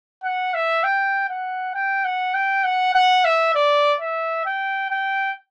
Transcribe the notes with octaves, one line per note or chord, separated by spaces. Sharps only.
F#5
E5
G5
F#5
G5
F#5
G5
F#5
F#5
E5
D5
E5
G5
G5